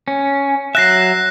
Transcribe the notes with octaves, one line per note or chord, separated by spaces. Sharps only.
C#4
F#3 E5 F#6 A#6 C7